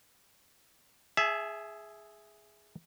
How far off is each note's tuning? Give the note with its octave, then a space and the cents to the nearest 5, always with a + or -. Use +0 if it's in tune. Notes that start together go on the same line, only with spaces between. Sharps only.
G#4 +0 E5 +0 A5 -45